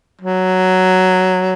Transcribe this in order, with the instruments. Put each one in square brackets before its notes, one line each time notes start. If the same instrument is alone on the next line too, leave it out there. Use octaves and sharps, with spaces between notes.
[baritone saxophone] F#3